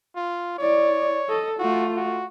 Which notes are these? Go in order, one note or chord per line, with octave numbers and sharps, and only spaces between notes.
F4
E4 C#5 D5
A4 D#5
A3 F4 F#4
F#4